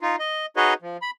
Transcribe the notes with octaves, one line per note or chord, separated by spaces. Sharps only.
D#4 F4
D#5
D#4 F#4 G#4 B4 C#5 D#5
F3
B5